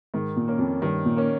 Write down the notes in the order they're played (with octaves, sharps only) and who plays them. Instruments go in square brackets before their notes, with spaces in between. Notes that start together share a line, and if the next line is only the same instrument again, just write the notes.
[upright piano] G#2 [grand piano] D#3
[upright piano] A#2
[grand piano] A#3 C#4
[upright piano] F2
[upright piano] G2 [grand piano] D#3
[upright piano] A#2
[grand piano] A#3 C#4